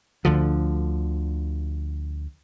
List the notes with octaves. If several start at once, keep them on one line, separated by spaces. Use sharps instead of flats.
D2 D3 F3